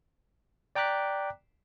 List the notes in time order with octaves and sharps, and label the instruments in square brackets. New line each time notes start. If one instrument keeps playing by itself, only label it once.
[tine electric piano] D5 G5 A#5 D6 F#6 B6